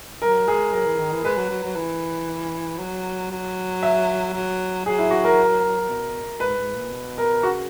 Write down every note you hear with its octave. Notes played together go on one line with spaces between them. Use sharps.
F#3 A#4
G#3 G#4
F#3 A#4
E3
D#3
E3
G#3 B4
F#3
F#3
F#3
E3
F#3
F#3
E5
F#3
F#3 G#4
E4
F#4
A#4
B2
G#2 B4
G#2
A#2
B2
A#4
C#3 F#4